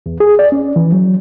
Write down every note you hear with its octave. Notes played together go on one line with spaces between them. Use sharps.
E2
G#4
D5
C#4
E3
F#3